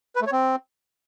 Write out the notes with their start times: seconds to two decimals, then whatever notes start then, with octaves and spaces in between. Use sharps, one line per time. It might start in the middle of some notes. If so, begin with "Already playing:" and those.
0.16 B4
0.21 A3
0.27 C#5
0.32 C4